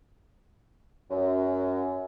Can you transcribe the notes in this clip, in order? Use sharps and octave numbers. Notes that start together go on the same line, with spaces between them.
F#2